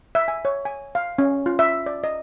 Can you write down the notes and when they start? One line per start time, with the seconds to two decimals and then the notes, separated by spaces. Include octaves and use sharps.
0.15 E5
0.28 G#5
0.45 C#5
0.65 G#5
0.95 F5
1.19 C#4
1.46 F4
1.59 E5
1.86 D5
2.04 D#5